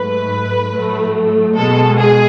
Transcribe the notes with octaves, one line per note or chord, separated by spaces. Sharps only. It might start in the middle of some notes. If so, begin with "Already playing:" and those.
Already playing: G#2 F#3 A3 B4
A2 F#3 A3
B2 G#3 A4
G#4